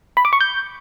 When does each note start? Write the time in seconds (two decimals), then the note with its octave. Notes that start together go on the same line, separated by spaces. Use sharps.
0.17 B5
0.25 D6
0.33 C#6
0.41 G6